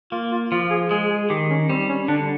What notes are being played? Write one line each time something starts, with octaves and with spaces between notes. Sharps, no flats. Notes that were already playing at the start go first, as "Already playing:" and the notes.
A#3 F4
F4
F3 F4
G#4
G#3 G#4
G#4
D#3 G4
C#4
G3 C4
C#4
D3 D4